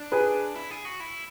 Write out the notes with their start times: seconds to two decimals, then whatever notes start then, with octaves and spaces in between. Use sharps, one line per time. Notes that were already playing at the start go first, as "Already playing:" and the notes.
Already playing: D4
0.12 G#4 B4
0.56 E4
0.71 G#4
0.85 F#4
1.00 E4